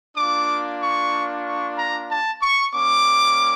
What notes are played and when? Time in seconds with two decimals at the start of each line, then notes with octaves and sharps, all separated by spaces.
0.16 A#3 D4 F4 D6
0.81 C#6
1.45 C#6
1.77 A#5
2.09 A5
2.42 C#6
2.74 G3 A#3 C#4 D6